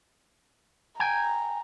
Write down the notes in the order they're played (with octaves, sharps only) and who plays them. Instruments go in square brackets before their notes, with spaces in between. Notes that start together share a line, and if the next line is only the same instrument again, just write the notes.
[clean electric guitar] G5 G#5 [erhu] A#5